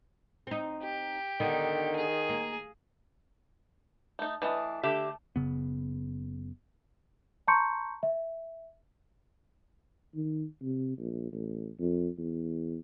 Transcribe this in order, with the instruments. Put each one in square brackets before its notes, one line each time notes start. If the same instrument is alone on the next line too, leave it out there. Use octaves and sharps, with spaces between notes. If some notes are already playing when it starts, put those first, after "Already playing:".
[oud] C4 D#4
[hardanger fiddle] G4
[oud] D3 B3 D#4 [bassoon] D#3
[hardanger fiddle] G#4
[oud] A#3
[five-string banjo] A3 D#4
[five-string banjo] E3 D4 D#5 [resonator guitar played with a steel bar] A3
[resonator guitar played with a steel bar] D3 G4 E5 [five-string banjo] A3
[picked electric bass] F#1 C#3 B3
[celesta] A5 A#5 C6 C#6 G6 C#7
E5
[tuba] D#3
C3
A#1
A1
F2
E2